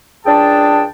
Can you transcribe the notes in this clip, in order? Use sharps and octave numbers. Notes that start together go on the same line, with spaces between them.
C#2 D4 G#4 G5 A5